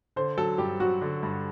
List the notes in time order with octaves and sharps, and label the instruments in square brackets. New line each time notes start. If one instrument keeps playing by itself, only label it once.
[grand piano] D3 [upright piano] C5
[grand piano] F#3 [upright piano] A4
[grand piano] G2 [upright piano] G4
[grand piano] F#3 [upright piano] F#4
[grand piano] D3
G2